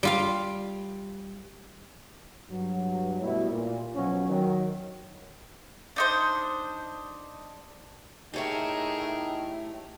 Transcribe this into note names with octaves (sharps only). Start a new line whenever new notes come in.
G3 F4 F5
G2 F#3
B2 G3 A3 E4
A#2
B1 B2 F3 F#3 C#4
D#3 F#3
D4 D#4 C5
A2 A3 D#4 G4 G#4 A#4 C#5 E5